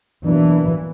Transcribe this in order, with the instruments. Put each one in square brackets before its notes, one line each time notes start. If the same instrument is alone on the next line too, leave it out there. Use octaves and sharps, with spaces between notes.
[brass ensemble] B2 F#3 A#3 D4 [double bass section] E3